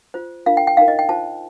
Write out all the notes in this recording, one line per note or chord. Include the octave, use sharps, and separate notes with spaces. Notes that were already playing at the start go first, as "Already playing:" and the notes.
F4 C5
D4 F4 A#4 F5
G5
G5
D#4 A#4 F5
D#5
G5
F4 C5 A5